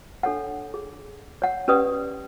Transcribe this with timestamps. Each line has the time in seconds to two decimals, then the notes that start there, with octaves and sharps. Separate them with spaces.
0.23 D4 A4 C#5 F#5
0.74 G#4
1.42 C#5 F#5
1.68 C#4 G4 B4 D5 D#6